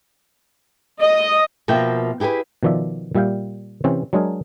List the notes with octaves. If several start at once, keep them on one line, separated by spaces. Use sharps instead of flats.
D#5
B2 F3 A#3 E5 G5
E4 G4 G#4 A#4 B4
B2 D#3 F3 D5 E5
A#2 G3 E5 F5 G5
C3 E3 C4 C#4
F#3 G#3 D4 G#4 A#4